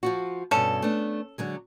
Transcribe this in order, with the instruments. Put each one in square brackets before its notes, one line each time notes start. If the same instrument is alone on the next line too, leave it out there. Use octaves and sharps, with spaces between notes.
[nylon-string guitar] F3 F4 F#4
[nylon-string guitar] G2 B2 [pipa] C#4 A4
[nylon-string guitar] A3 B3 D4
D3 F#3 G#3